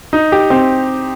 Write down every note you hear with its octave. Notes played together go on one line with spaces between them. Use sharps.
D#4
G4
C4